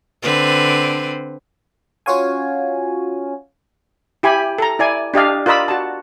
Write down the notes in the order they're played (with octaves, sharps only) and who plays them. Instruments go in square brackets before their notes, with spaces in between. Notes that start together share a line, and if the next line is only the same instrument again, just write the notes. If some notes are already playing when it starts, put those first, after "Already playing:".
[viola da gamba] D3 C4 B4
[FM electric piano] C#4 F4 F#4 C#5 F5 G#5
[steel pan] E4 G4 G#5 B5
A4 A#5
E4 D5 G#5
D4 G4 D#5 F5
F4 A#4 D5 D#5 B5 E6
F#4 A5